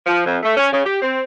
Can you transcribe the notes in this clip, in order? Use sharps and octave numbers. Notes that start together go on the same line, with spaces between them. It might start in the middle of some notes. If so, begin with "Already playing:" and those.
F3
F2
A3
C#4
C#3
G4
C4